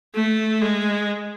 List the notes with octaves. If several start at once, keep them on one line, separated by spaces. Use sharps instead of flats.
A3
G#3